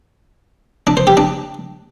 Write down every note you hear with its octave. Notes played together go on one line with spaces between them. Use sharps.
D4
C5
G4
D4